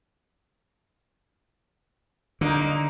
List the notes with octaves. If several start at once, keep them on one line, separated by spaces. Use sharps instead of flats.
D3 A#3 D#4